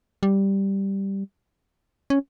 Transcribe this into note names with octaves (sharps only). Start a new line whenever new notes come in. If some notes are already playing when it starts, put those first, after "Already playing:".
G3
C#4